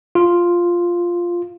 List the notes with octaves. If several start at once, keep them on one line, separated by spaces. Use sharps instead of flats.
F4